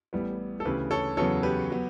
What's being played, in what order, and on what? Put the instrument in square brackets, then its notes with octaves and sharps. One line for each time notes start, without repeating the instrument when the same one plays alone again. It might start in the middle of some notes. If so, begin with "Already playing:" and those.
[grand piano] A1 A2 G3 B3
A4
D2 C#3 E3 G4 B4
A4 C#5
E2 C#3 F#3 B3 A4 C#5
G4 B4
F#3 B3